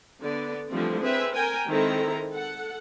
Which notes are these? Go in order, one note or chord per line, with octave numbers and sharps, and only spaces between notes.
D3 B3 D5
D3 E3 F3 G3 A3 C4
C4 G#4 B4 E5
A#4 G5 G#5
D#3 G#3 C4 E4 A4 A#5
A4 F#5